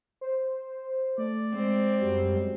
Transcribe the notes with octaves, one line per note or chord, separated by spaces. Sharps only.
C5
A3 D5
G#3 C4
F#2 F#3 G3